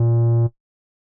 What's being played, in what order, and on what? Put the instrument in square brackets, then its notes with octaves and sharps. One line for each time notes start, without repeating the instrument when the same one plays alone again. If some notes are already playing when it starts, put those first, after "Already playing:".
Already playing: [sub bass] A#2